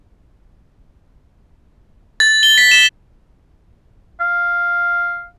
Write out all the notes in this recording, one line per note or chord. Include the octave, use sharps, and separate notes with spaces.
A6
G7
B6
E7
F5